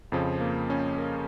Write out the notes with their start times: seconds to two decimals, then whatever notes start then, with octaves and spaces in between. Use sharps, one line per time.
0.12 F2 C#3 F3
0.41 A#3
0.70 C#4
0.98 A#4